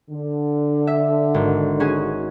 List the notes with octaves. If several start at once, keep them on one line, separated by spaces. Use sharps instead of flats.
D3
E5
G#1
C#4 F#4 G#4